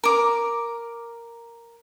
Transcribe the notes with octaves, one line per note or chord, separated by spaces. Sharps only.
A#4 D6